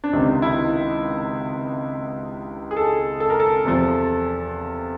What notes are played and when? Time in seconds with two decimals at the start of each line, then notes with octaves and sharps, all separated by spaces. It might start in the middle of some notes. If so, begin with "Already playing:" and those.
0.04 D4
0.13 C#2 C3 D#3 D#4
0.42 E4
2.71 G#4
2.77 A4
3.20 A4
3.30 A#4
3.40 A4
3.65 E2 C3 F3